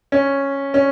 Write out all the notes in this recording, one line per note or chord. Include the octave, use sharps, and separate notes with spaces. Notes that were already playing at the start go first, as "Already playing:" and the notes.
C#4
C#4